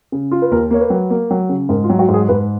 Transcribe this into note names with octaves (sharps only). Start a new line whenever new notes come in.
C#3
F4
B4
D#2 A#4
A#3 C#5
B4
F#3
A#3
F#3
C#3
G#2 A#4
F4
F#3
F#4
G#2
G#4
G#2 B4